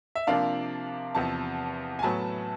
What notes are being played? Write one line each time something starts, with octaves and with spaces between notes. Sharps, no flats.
E5
C3 F3 A#3 D4 F4 F5
E2 C3 F3 A5
G#5
A2 F#3 B3 A5